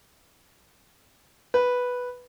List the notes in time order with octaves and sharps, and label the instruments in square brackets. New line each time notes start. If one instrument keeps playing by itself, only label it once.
[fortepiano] B4